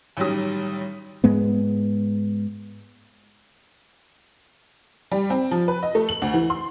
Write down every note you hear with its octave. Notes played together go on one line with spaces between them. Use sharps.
A1 D#3 F#3 G3 D#6
G#2 G#3 B3
G3
C4
F3
B4
D#5
A3
F#7
D2
E3
C6